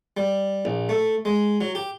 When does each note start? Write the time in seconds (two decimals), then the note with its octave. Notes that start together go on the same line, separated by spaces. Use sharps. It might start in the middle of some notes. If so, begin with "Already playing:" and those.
0.17 G3
0.65 A#1
0.89 A3
1.25 G#3
1.61 F#3
1.75 G4